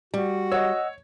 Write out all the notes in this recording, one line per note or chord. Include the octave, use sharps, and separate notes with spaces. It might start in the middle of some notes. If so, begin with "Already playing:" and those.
G3 F#4
C#5 D#5 F#5 E6